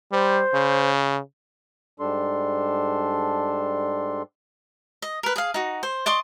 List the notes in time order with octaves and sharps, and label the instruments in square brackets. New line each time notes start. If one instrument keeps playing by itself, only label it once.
[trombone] G3 [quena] C5
[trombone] C#3
[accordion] G#2 G3 D4 A4 C6
[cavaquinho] D#5
A#4 B4
G#4 F5
D#4 F#4
C5
D5 D#5 C6 C#6